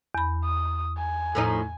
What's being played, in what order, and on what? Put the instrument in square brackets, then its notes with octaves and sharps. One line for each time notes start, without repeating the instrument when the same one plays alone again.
[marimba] E2 B5
[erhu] D#6
G#5
[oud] A2 F3 D#4